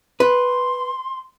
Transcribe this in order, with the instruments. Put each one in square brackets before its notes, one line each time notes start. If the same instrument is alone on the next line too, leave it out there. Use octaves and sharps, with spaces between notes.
[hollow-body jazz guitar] B4 [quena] C6